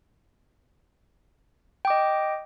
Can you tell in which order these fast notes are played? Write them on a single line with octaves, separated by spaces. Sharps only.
G5 D6 D#5